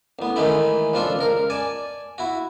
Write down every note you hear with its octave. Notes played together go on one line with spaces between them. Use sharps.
A1 B3
D#3 E3 G#3 A3 E4
C#2 F3 D4 F4 A4
C#2 A#4
D5 G#5 A5
E4 F#4